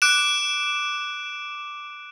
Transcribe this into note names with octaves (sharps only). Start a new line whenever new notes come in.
D6 F#6 D7 E7